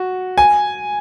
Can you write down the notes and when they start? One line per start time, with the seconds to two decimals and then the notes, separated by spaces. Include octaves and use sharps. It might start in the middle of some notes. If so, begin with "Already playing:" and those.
Already playing: F#4
0.38 G#5